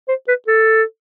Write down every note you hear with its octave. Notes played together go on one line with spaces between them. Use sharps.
C5
B4
A4